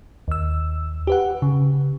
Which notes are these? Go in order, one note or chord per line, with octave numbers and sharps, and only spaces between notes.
D#2 E6
G4 B4 F#5
C#3